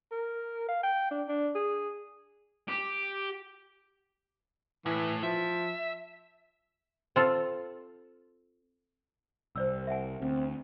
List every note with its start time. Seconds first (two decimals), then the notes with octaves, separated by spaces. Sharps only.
0.12 A#4
0.69 F5
0.83 G5
1.11 D4
1.29 D4
1.55 G#4
2.69 G4
4.86 A2 E3
5.23 F3 E5
7.16 C4 F4 A4
9.56 C2 C5 D5 E6
9.87 E5 F#5 G#5
10.22 D2 C4